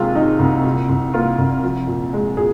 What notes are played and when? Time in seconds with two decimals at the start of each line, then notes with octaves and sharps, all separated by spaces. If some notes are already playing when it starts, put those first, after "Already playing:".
Already playing: D#2 C3 G#3 F4
0.16 D#3 D#4
0.39 C2
0.65 A#2
0.89 C2
1.14 A#3 F4
1.38 C2
1.63 F3
1.87 A#2
2.13 G#3
2.37 A#2 G#4